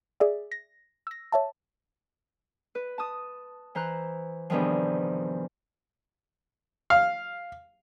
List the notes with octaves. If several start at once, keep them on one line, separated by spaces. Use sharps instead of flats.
G#4 D5 E5
A#6
E6 A#6
C#5 E5 A5
B4
A5 D#6
E3 C5 A#5 F#6
E2 G2 C3 D#3 F3
F5